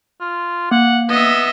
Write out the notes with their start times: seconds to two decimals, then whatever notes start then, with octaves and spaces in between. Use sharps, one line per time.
0.21 F4
0.71 A#3 F#5
1.09 B3 D#5 E5